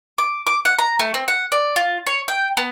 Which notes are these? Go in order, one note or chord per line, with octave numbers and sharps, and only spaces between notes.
D6
D6
F#5
A#5
A3
C4
F#5
D5
F4
C#5
G5
B3